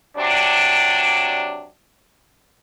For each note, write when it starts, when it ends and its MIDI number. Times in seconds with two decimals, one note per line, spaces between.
0.18 1.67 48
0.18 1.67 54
0.18 1.67 62